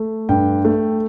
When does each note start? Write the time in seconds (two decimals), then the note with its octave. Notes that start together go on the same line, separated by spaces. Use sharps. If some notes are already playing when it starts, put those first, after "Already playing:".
Already playing: A3
0.29 G2 G5
0.65 A3